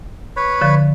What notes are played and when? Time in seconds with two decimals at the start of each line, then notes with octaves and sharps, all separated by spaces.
0.36 B4 C#5 B5
0.61 D3 F3